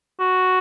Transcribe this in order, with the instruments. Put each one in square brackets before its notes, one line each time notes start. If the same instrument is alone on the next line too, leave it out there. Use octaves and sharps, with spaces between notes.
[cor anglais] F#4